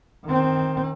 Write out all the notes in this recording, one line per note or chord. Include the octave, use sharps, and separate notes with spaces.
D#3 C4